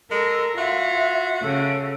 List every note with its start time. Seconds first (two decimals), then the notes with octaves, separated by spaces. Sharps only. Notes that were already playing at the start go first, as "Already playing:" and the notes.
0.11 G#3 A4 A#4
0.57 F4 F#4 E5
1.43 C#3 A4